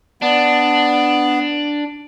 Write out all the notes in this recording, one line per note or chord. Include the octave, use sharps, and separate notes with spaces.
B3 D4